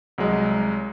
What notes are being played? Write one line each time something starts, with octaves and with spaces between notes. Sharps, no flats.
C2 F#3 G#3